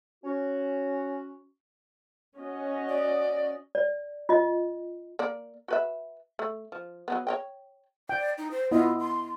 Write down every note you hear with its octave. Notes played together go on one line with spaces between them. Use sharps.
C#4 F#4
C#4 F#4 D#5
D5
D5
F4 D#5
A#3 D5
F#4 B4 E5
A3
F3
F#3 A#3 B3
C#5 D#5 G5
D5 G5
D#4
C5
B3 E4 F4 D#5
C6